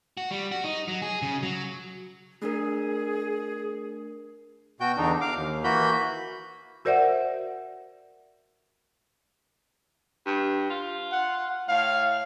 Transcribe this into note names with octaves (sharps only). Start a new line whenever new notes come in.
F#4
G3
F#4
D#4
F#3
G#4
C#3
F#3
A3 D4 G#4 A#4
B2 F#4 G5 G6
E2 D3 D4 D#4
F5 D6
D#2
E3 A#3 F#4 B5 G6
F#4 A#4 C5 D5 E5 F#5
G2
F4
F#5
A2 F5